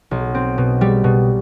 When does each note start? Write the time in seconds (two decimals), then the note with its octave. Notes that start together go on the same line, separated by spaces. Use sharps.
0.11 B1
0.35 C4
0.58 B2
0.81 G3
1.04 B2